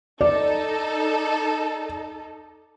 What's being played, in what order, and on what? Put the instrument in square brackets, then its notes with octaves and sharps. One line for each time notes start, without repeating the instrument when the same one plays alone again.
[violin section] D#4 A4 [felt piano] D5